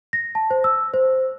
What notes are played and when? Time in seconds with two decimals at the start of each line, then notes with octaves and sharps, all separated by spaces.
0.13 A#6
0.35 A5
0.51 C5
0.64 E6
0.94 C5